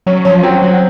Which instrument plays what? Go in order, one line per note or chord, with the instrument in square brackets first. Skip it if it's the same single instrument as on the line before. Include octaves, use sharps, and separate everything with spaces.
[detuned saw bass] F#3 [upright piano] C#4
[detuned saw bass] F3 [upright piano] C#4
[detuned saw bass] F#3 [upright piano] C4
[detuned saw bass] F#3